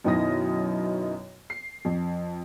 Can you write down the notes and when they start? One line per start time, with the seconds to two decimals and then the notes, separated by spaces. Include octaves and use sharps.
0.04 F#2 B2 D#3 E4 D#6 A#6
1.50 C7
1.85 F2